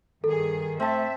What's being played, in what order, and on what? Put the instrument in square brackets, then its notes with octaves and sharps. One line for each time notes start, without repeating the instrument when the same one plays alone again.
[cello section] G2 G#4 [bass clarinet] D#3 [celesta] A4
[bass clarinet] A3 [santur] C4 A5 [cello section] E5